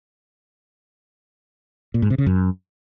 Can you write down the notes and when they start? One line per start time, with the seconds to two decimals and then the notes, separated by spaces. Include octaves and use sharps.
1.94 A#2
2.02 G#2
2.10 C3
2.18 C#3
2.26 F#2